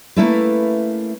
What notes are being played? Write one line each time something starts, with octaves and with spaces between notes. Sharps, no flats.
A3 A#3 C#4 E4 A4 B4